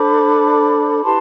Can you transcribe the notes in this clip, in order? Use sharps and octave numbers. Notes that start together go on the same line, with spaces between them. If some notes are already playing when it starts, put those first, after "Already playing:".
Already playing: D4 A4 C5 B5 D6
E4 G4 B4 A5 C6